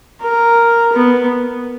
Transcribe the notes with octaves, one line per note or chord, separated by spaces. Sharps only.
A#4
B3